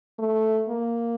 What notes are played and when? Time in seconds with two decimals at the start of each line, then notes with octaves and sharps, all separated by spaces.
0.19 A3
0.69 A#3